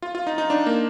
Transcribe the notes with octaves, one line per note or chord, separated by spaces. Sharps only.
F4
F4
D#4
D#4
D4
A#3